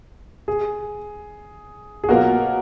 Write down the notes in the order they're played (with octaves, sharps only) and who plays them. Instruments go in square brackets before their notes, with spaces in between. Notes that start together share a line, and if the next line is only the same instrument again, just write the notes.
[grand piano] G#4
G#4
[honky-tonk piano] B2 F#3 A#3 F4 A#4 [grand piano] F#4